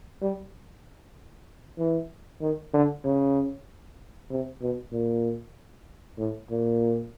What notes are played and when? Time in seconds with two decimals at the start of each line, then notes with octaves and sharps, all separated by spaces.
0.22 G3
1.79 E3
2.41 D#3
2.74 D3
3.05 C#3
4.30 C3
4.61 B2
4.93 A#2
6.18 A2
6.51 A#2